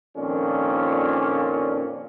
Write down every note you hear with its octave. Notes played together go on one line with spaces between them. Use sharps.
F2 A#2 D#3 F3 C#4 D4